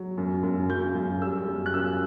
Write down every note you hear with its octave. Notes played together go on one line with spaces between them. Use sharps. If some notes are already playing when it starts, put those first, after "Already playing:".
Already playing: F#3
F#2
F#2
F#2 G6
F#2
G3 E6
F#2
F#6
F#2 E6